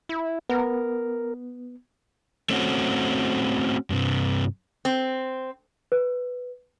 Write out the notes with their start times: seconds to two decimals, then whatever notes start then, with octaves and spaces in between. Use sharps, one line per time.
0.09 E4
0.50 B3 A#4
2.50 A3 C4 C#4 F#4
3.90 G2 C3
4.85 C4
5.92 B4